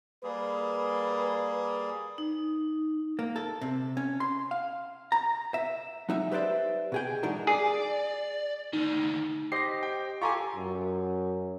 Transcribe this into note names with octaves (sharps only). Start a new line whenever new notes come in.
G3 A#3 G#4 B4
D#4
A#3
A4
C3
C#4
C6
F5
A#5
E5
F#3 D#4 E5
G4 B4 C5 D5 E5
B2 G#4 G5
G#2 E3 D4 D#4 F#4 A#4
G#4 D5
D2 D#3 D#4
G4 C5 D#5 A#6 C7
G5
F4 G4 A4 G#5 A#5 C#6
F#2